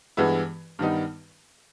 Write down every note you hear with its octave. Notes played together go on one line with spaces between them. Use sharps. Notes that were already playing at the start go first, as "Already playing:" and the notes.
G2 E3 G#3 B3 E4
G2 D#3 G3 B3 D#4